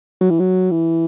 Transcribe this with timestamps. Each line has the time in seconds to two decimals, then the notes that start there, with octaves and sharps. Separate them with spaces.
0.21 F#3
0.30 E3
0.39 F#3
0.71 E3